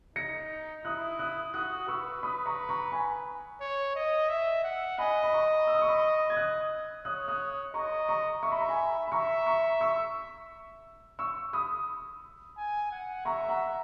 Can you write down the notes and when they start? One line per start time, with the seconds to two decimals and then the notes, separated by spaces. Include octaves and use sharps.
0.16 D#4 A#6 C#7
0.85 E4 D#6 F#6
1.19 D#6 F#6
1.54 F#4 D#6 F#6
1.88 B4 C#6 E6
2.23 B5 D#6
2.46 A#5 C#6
2.69 A#5 C#6
2.92 G#5 B5
3.61 C#5
3.95 D#5
4.29 E5
4.64 F#5
4.98 D#5 G#5 B5
5.23 B5
5.33 A#5 C#6
5.67 E6
5.74 D#6
5.82 C#6
5.88 B5 D#6
6.30 G#6
6.37 D#6 F#6
7.05 C#5 D#6 F#6
7.28 D#6 F#6
7.74 D#5 A#5 C#6
8.08 A#5 C#6
8.43 E5 C#6
8.52 B5
8.60 A#5
8.69 G#5 B5
9.08 B5
9.12 E5 A#5 C#6
9.46 A#5 C#6
9.80 C#6 E6
11.19 C#6 E6
11.53 B5 D#6
12.57 G#5
12.91 F#5
13.25 E5 A#5 C#6
13.48 F#5 A#5